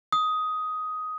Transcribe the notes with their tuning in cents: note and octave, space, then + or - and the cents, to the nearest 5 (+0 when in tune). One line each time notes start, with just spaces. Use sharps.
D#6 +10